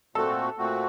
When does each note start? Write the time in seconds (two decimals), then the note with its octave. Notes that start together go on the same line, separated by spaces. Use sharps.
0.15 A#2 A3 C4 F#4 A4
0.57 A#2 A3 C4 F#4